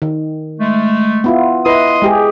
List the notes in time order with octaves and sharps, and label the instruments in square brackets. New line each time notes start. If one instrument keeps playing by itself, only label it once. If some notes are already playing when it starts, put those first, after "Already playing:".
[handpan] D#3
[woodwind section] G#3 A3
[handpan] B3 E4 F4
[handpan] E4 B4 [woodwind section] D#5 C6 D#6
[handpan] G#3 G4 G#4